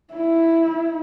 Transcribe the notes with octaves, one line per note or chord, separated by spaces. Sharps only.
E4